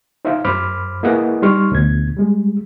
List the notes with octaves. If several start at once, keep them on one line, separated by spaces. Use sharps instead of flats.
D#4 C5 E5 F5
F#2 C5 B5 D6 F6
A#3 E4 G#4 B4 D#5 F#5
G3 D#4 C6 C#6 F6
D2 B2 G#6
G3 G#3